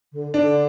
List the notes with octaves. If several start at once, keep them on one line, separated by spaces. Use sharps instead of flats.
D3
D4
D3